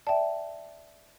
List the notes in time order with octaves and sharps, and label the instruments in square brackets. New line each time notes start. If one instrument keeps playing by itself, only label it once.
[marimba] D5 E5 [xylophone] G5 A5